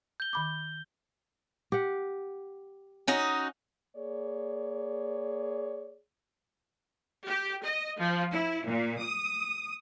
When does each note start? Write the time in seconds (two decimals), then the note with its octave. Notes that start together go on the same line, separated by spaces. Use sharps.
0.20 G6 G7
0.33 D#3 B5 D6
1.72 G4 F#5
3.08 C#4 D#4 F#4
3.96 A#3 G#4 C#5 D5
7.26 G4
7.64 D#5
7.99 F3
8.32 E4
8.66 A#2
9.00 D#6